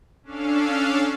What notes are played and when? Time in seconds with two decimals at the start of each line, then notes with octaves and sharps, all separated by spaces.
0.23 C#4 D4 A4 F5